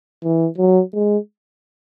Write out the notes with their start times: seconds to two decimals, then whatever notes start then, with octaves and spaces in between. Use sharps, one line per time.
0.23 E3
0.58 F#3
0.93 G#3